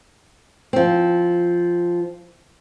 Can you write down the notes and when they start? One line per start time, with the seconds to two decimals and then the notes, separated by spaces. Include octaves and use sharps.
0.73 F3 C4